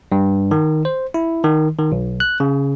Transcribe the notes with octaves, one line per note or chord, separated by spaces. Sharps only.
G2
D#3
C5
E4
D#3
D#3
B1
F#6
C#3